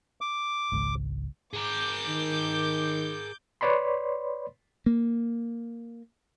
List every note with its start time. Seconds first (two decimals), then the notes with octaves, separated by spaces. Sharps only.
0.21 D6
0.72 G#1 C#2 G#2
1.54 G#4 A#4 D6 G6
2.07 D#3
3.61 B4 C#5 D5 B5 C6
4.86 A#3